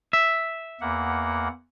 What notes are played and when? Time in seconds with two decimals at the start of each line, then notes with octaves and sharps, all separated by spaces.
0.13 E5
0.81 E2 A#3 F#5